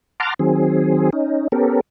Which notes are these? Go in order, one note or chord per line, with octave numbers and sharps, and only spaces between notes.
F#5 A5 A#5 C6 D6 F6
D#3 F#3 C4 G#4
C#4 D#4
B3 C#4 G4 A4 A#4